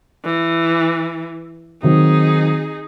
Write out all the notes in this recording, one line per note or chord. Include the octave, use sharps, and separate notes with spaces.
E3
D#3 F#3 C4 D#4 G#4